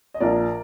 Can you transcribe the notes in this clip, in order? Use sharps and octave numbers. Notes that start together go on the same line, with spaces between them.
D#5
A#1 A#2 F3 A#4 D5